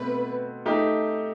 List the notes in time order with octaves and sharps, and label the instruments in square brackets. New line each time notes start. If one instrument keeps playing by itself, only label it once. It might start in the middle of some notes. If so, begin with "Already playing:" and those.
Already playing: [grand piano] B2 A3 C4 [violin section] B4
[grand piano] A3 D#4 G4